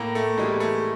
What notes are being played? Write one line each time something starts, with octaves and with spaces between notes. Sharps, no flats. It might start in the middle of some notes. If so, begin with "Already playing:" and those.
Already playing: A2 A#3
A3
E3 G3 G#3
A3